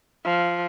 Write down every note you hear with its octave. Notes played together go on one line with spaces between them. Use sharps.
F3